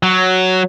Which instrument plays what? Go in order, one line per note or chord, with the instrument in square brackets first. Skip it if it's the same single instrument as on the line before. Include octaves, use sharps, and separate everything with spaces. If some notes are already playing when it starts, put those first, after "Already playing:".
[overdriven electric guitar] F#3